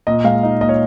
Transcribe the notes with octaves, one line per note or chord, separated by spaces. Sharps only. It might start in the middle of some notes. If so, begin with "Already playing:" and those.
A#2 D#5
G#3 F5
D#4
A#2 D#5
C#5